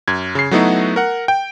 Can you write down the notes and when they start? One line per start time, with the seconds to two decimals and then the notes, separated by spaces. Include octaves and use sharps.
0.08 F#2 G#6
0.35 C#3 C7
0.51 F#3 A3 B3 D#4 E4 F#4
0.96 A#4 F#5
1.28 G5